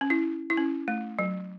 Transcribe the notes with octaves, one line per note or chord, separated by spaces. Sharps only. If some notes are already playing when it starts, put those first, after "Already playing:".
C#4
E4
E4
C#4
A3
F#3